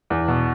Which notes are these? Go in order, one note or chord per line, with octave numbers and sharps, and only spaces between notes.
E2
B2